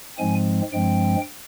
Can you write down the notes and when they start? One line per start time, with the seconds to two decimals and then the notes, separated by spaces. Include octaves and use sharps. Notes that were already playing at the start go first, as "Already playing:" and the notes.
0.18 G#2 F3 G#3 C4 G#5
0.72 G2 F3 G#3 C4 G5